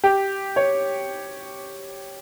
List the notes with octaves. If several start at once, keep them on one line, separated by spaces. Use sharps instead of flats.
G4
C#5